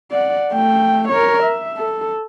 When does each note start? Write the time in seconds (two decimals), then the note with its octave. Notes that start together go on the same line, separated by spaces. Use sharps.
0.11 D5 F#5
0.53 A3 G5
1.09 A#4 C#5
1.43 E5
1.77 A4